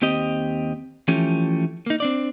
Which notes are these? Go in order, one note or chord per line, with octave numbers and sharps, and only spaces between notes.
D#2 C4 G4 D#5
E3 F3 A3 C#4 G4
A#3 D#4
C4 D4 D5